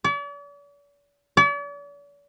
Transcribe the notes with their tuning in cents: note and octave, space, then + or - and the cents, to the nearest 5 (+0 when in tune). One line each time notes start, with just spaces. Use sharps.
D5 -45
D5 -45